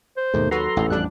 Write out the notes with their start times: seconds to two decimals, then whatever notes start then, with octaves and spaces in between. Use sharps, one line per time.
0.17 C5
0.34 D#2 G#2 B2 D#3 A3
0.51 F#3 F#4 A4 B4 A#5 C6
0.77 A1 E2
0.90 F2 G3 D4 F#6